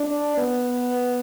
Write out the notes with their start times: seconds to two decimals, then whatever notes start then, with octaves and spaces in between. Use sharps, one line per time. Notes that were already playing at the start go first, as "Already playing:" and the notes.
Already playing: D4
0.37 B3